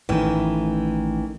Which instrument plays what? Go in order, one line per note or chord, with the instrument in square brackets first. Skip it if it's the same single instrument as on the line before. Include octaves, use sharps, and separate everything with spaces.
[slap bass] A1 A3 [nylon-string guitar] D#3 E3